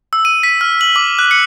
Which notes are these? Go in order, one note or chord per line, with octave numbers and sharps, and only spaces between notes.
E6
D#7
B6
F6
F#7
D6
F#6
C#7